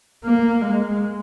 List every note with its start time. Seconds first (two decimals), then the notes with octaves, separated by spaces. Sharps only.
0.24 A#3
0.62 G#3